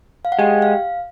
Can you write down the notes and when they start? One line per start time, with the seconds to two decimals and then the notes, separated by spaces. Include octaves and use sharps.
0.25 F5
0.32 F#5
0.39 G#3 G4 G5
0.62 F5